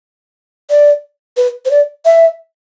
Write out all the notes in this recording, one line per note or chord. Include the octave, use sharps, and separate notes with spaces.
D5
B4
C5
D5
E5